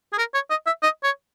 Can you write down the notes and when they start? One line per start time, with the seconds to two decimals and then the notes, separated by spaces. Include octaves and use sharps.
0.13 G#4
0.18 A#4
0.34 C#5
0.50 D#5
0.66 E5
0.83 D#5
1.04 C#5